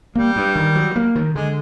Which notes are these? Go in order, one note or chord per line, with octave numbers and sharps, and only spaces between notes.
G3 A#3
G2
D#3
F#3
A#3
D#3
D3 G#3